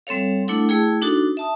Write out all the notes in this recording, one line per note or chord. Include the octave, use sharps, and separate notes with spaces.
G3 C4 A4 C#5 F5
A3 D4 E4 A4 F#5
A3 E4 G#4 G5
D4 D#4 F#4 A4
E5 A5 D#6